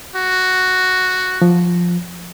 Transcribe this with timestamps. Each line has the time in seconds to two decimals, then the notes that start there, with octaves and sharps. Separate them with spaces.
0.16 F#4
1.42 F3